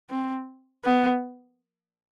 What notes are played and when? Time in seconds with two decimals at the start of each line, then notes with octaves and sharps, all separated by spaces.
0.10 C4
0.85 B3